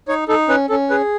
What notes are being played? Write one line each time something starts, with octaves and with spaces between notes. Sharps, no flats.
D#4 C#5
D#4 A4
C#4 B4
C#4 A4
G#4 B4